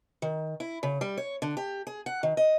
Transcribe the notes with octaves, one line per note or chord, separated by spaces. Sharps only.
D#3
E4
C#3
G3
C#5
D3
G4
G#4
F#5
D#3
D#5